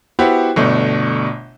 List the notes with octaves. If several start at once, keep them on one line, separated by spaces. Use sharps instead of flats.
B3 E4 F#4 G4 C5
G1 B2 A3 D4